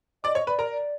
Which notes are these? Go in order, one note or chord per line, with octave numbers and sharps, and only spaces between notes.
D5 D#5 D6
C#5 C#6
B4 D5 B5
A#4 A#5
D5